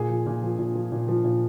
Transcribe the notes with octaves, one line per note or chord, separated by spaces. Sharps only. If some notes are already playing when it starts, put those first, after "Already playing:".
Already playing: A#2 G#4
F3
A#2
F3
A#2
F3
A#2
F3
A#2